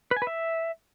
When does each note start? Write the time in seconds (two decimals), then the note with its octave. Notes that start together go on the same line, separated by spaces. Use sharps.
0.11 B4
0.17 G#5
0.22 B4
0.27 E5